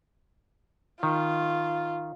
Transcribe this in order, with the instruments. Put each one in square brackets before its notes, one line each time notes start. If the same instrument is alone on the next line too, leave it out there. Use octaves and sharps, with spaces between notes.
[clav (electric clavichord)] D#3 [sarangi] F4